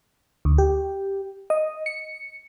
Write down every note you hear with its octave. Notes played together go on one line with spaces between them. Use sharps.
D2
G4
D#5
C#7